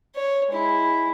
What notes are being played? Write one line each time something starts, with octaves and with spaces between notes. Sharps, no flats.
C#5
G#3 E4